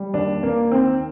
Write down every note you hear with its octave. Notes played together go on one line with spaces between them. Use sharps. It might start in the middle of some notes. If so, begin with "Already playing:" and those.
Already playing: G3
D#2 D4
D#2 A#3
D#3 C4